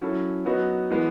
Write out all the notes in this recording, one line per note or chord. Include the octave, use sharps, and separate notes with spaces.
F#3 C#4 E4 A4
F#3 B3 D#4 F#4
E3 G#3 B3